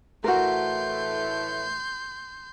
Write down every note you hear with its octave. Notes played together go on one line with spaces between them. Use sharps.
A2 E3 A3 F#4 A#4 C6 G6